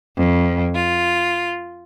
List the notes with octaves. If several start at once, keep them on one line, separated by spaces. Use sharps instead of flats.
F2
F4